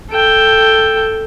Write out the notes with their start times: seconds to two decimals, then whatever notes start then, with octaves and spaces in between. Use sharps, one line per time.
0.11 A4 G5